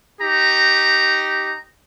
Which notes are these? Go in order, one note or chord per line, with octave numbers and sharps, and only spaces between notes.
D#4 G4 A#5